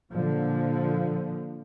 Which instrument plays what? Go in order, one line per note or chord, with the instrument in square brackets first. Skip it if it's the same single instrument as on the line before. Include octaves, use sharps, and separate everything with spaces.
[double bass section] A#2 D3 F3